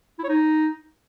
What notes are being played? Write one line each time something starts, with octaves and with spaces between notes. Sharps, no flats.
E4
C#5
D#4